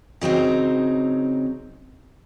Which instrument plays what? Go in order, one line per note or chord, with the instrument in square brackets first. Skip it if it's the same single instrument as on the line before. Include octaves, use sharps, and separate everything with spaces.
[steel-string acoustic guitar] C#3 F#3 C4 D#4